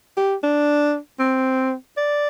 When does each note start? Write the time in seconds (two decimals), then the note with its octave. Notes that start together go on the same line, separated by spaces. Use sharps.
0.17 G4
0.43 D4
1.19 C4
1.97 D5